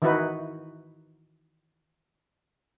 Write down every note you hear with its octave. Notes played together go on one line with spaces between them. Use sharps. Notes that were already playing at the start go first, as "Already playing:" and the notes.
D#3 E3 D#4 E4 F#4 B4